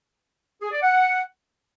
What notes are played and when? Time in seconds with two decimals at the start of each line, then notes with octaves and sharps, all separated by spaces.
0.61 G#4
0.71 D5
0.82 F#5